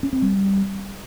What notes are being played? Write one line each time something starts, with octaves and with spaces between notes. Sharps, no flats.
C#4
C4
G3